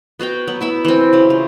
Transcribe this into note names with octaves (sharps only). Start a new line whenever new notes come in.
B3 F#4 F5 G5
F#3 B3
B3 E4 E5
E3 C4
C#3 F#3
F4